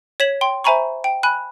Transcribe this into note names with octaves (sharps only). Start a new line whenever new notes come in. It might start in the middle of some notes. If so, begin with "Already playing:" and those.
C#5 G#6 B6 E7 F#7
G5 C6
C5 E5 G#5 A#5 B5 C#6
G5
G#5 B5 F#6